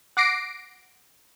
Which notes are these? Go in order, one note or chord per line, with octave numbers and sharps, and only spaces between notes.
F#5 D6 A#6 C7 D7